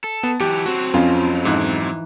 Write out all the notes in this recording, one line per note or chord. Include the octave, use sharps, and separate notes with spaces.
A4
B3 A5
E3 F#3 G4
F#3 C4 F#4
F2 F3 C#4 F4
G#2 E3 D#4 F#6